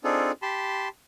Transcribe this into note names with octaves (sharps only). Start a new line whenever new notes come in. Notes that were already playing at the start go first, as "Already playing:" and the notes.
C4 D4 D#4 F4 G#4 A4
G4 A5 B5 C6